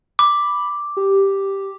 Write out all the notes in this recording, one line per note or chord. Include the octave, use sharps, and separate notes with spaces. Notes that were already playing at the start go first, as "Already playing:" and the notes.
B5 D6
G4